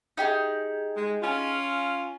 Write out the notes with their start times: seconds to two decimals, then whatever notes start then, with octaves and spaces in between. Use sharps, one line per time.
0.17 D#4 G4 G#4
0.96 G#3
1.22 C#4 F4